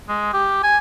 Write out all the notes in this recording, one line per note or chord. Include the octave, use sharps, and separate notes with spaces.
G#3
G4
G#5